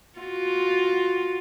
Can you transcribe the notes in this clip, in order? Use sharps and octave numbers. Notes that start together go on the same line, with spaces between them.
F4 F#4